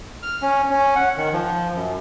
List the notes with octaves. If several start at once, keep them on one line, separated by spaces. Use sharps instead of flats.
F6
C#4
C#4
F#5
D#3
F3
F#2